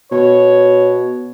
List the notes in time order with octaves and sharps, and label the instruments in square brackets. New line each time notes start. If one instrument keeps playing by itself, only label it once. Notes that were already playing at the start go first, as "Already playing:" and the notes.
[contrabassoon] B2 [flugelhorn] C#5